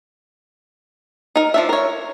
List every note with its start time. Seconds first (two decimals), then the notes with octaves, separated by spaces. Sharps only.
1.36 D#4 A#4
1.54 F3 D4 E5
1.69 A#4 C#5